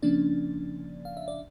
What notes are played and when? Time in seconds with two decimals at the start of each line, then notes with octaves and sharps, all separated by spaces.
0.02 C#3 F3 A#3 C#4 D4 D5
1.05 F5
1.17 E5
1.28 D5